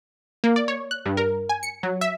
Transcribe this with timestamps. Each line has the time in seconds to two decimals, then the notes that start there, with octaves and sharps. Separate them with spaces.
0.44 A#3
0.56 D5
0.68 C#5
0.91 F#6
1.06 G2
1.17 A#4
1.49 G#5
1.63 C#7
1.83 F#3
2.01 E5